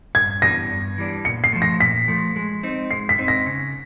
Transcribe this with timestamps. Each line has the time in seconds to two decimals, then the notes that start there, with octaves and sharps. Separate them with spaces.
0.15 G2 G#6
0.42 E3 G3 B3 D4 A#6
0.70 G2
0.98 E3 G3 B3 D4
1.25 A#2 C#7
1.44 C7
1.53 F3 A3
1.62 A#6
1.80 A#2 B6
2.08 F3 A3
2.36 G#3
2.63 C4 D#4
2.91 G#3 C7
3.09 B6
3.18 C4 D#4
3.28 A#6
3.46 C#3